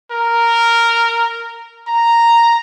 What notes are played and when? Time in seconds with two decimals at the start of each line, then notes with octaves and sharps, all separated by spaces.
0.12 A#4
1.88 A#5